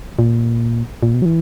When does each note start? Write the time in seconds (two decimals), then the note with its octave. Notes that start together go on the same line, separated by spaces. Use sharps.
0.19 A#2
1.03 A#2
1.14 B2
1.22 F#3
1.25 E3